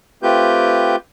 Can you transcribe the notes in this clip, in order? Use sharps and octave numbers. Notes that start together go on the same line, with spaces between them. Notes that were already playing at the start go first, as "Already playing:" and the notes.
A3 C4 F4 G4 B4 G6